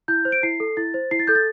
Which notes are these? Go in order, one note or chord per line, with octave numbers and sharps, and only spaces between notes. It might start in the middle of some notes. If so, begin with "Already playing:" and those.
E4 G6
C5
D7
E4 C7
A4
E4 A6
C5
E4 C7
A6
A4 G6
A6